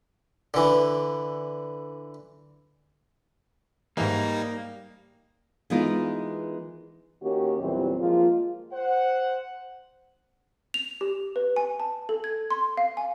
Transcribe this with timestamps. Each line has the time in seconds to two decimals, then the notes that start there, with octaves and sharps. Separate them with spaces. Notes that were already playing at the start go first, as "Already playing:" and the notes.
0.54 D3 E3
3.97 G#2 E3 G3 A#3 D#4
5.70 E3 G#3 B3 D#4 F4 A#4
7.22 D#3 A#3 C#4 F#4 G4
7.60 E2 A#2 E3 F#3 G3 C4
7.99 F3 G#3 A#3 F4
8.72 C5 F#5
10.74 F7
11.01 G4
11.36 B4
11.56 G#5
11.80 A5
12.09 A4
12.24 G#6
12.51 C6
12.77 F5
12.97 G#5